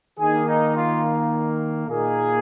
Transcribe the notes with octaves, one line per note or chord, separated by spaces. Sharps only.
D#3 A#3 D#4 G#4
D#4
F4
A#2 A#3 D#4 G#4